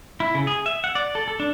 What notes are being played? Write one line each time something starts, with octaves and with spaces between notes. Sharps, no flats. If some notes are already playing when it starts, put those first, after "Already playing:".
E4
C#3
G#4
E5
F#5
D5
A4
A4
D4